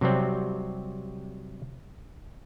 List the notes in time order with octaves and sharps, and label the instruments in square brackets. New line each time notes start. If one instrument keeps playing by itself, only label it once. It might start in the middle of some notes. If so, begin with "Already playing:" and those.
[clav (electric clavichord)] C3 F#3 G3 C4